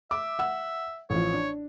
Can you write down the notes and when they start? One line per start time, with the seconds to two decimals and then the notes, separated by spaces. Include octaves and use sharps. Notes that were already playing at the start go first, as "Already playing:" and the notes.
0.11 E5 D6
0.39 F#5 E6
1.10 A1 F3 C#5
1.33 D4